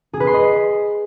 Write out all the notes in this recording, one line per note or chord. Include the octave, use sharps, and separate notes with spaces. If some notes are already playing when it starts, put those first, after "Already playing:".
G#4
B4
C6
D#5